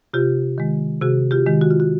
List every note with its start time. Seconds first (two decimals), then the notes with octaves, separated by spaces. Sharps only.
0.14 C3 F4 G4
0.58 D#3 G#3
1.01 C3 F#4 G#4
1.31 F4 G4
1.46 D#3 G#3
1.61 F#4
1.71 F4
1.80 F#4